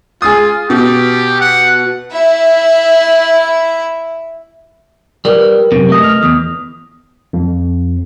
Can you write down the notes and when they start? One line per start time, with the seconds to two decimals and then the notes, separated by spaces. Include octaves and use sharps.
0.22 F4 G#4 D#6
0.70 B2 G4
1.40 F#5
2.12 E4 E5
5.25 G3 A#4 B4
5.72 F#2 C3
5.90 A3 D#5
6.03 F6 F7
6.23 E2 D#6
7.33 F2